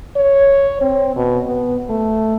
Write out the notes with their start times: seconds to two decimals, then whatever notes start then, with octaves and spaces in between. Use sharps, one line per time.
0.16 C#5
0.82 C4
1.16 B2
1.47 B3
1.89 A3